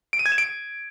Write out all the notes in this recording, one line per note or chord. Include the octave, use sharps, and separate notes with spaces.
D7
D#7
G#6
E7
D7